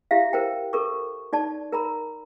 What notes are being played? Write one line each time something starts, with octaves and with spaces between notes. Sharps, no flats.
E4 G4 E5 F5
A#4 C5 G5
A4 A#4 C#6
D#4 D5 A5
A#4 A#5 B5